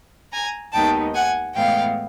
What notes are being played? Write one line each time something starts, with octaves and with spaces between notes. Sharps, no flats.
G#5 A#5
D#2 D#3 G#3 B3 D#4 G5 A5
F#5 G#5
A2 E3 G#3 B3 F5 G5